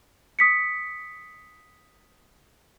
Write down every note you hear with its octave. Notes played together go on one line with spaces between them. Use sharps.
D#6 B6 C#7